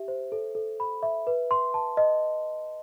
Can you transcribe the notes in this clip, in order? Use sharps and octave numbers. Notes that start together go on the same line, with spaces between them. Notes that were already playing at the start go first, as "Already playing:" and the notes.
Already playing: G4 E5
C5
A4
A4
B5
E5
B4
C6
A5
D#5